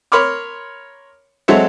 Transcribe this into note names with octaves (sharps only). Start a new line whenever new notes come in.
A#4 C#5 B5 C6 D6 F6
F#3 G#3 C4 A4 C#5 E5